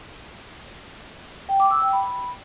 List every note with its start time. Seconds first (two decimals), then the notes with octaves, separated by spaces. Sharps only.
1.49 G5
1.60 D6
1.71 E6
1.82 G5
1.93 B5